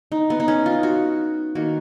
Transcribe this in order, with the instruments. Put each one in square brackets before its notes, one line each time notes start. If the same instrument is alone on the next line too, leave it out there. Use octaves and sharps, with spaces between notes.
[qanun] D#4
B3
D#4
C#4
F4
F#4
D#3 A#3 F#4